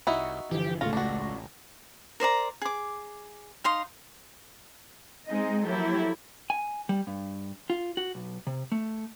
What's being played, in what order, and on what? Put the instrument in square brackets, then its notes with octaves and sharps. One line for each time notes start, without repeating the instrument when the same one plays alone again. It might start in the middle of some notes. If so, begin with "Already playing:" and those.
[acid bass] C2 [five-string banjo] D#4 E4 F#4 [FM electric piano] C#6
[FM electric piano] G1 D3 [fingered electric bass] E3 F3 [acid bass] G4
[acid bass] A1 [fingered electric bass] D2 A2 C#3 [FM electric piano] A3 C#6 A#6 [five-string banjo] F4
[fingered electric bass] C#2 [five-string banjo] D4 F#4
[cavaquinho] A#4 C5 D5 A#5
G#4 D6
D#4 F5 C6 D#6
[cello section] G#3 C4 D#4 D#5
F3 F#3 A#3 E4 G4 A4
[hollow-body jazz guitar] G#5
G3
G2
F4
F#4
B1
C3
A3